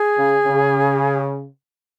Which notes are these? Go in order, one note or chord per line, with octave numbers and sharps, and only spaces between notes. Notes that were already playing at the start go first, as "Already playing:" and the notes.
Already playing: G#4
C#3
C#3